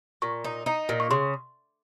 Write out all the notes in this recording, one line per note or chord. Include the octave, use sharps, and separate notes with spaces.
A#2 C#6
D#4
D#4
A#2
C#6
C#3 C6